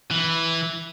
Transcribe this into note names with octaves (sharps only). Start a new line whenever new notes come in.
E3